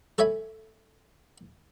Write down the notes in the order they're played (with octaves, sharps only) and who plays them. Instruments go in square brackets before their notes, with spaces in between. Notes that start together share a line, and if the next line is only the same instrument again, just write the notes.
[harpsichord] A4 C#5 E5 G#5 B5